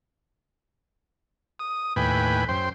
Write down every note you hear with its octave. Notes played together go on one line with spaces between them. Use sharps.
D#6
D#2 A2 B4 G5 G#5 B5
F#2 C5 G5 C6